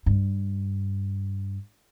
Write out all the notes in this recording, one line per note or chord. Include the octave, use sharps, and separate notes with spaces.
G2